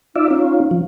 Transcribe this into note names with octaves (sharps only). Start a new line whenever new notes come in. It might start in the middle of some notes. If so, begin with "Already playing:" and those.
D#4 F4 D5 E5
C#4 F4
F3